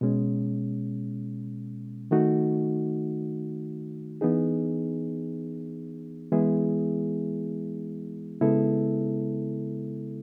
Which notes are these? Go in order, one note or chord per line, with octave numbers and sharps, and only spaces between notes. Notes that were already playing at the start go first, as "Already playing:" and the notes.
B2 G#3 C#4
D#3 A3 D#4 F#4
E3 B3 D#4 G#4
E3 G#3 B3 E4 G#4
C#3 G#3 B3 E4 A4